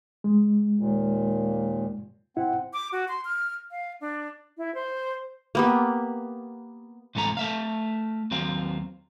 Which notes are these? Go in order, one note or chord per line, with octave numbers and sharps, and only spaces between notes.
G#3
D#2 A#2
C4 E4 F#5
D6
F#4
C6
F6
F5
D4
E4
C5
A#3 B3 G4
C2 G#2 E3 A3 C4 A#5
A3 E5 F5
D#2 F#3 C4 F5